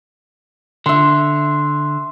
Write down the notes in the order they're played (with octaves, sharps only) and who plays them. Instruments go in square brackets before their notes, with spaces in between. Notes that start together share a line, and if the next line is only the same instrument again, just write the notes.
[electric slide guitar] D3 [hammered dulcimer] E5 C6